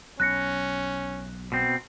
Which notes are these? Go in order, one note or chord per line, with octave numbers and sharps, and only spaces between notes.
B1 C#4 F#6 A#6 C#7
B2 C4